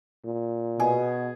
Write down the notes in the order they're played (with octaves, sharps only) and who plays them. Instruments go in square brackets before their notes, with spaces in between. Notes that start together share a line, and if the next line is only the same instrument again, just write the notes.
[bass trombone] A#2
[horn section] B2 [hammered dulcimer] G#4